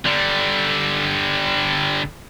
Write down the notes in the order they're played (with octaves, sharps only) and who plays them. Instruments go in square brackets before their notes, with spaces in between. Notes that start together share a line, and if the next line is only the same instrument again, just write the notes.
[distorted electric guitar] D3 G3